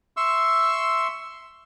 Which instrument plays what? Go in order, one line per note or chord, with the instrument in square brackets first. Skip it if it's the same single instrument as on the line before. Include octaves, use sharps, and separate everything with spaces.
[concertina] E5 C6 C#6 E6